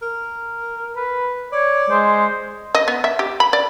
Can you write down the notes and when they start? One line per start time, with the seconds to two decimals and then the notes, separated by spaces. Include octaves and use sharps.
0.02 A#4
0.96 B4
1.53 C#5 D5
1.90 G#3 C5
2.75 D#5
2.88 B3
3.04 E5
3.19 G4
3.40 B5
3.53 D5